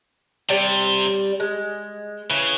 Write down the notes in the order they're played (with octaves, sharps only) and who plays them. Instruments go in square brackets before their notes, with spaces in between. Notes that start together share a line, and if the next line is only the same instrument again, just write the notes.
[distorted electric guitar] C3 [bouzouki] G3
[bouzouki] G#3
[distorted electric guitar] C#3 [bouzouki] E3